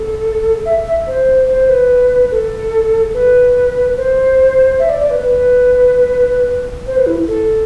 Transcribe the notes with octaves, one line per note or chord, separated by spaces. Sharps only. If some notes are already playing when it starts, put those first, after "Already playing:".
Already playing: A4
E5
E5
C5
C5
B4
A4
B4
C5
E5
D5
D5
B4
B4
C5
B4
E4
A4